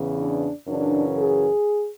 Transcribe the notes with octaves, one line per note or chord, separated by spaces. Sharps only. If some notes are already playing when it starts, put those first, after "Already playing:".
Already playing: E2 C#3 E3
D4
F#2 C#3 E3 D4
G#4